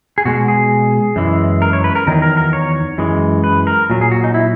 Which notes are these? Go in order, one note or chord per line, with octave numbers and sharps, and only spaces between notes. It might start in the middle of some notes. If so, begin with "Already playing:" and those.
G#4
B2 G#3 F#4
G#4
F#2 E3 G#3
A#4
C#5
B4
A#4
E2 D#3 F#3 A#4
A#4
A#4
C#5
F#2 E3 G#3
B4
A#4
A#2 F#3
G#4
F#4
D#4
E4